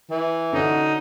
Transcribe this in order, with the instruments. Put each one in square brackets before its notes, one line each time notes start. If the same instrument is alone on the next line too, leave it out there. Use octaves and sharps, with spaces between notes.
[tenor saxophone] E3
[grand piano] D3 C#4 F#4 [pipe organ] D#4